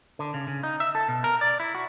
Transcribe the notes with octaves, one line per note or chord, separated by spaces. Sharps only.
D3
C#3
C#3
D#4
E5
A4
B2
A#4
D5
E4
F#4